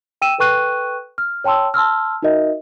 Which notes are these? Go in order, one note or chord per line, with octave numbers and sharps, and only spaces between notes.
G5 E6 D#7 E7
A4 B4 G5 C#6 F#6 D#7
F6
C#5 G5 A5 C6 E6
A5 C6 E6 F6
D#4 F#4 A#4 D#5 E5